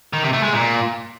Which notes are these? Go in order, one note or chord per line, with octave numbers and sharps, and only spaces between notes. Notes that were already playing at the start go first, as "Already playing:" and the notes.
D#3
C3
A3
G#3
A#2